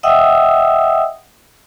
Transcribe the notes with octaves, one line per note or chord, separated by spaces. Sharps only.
D#5 E5 F#5 G5 D#6 E6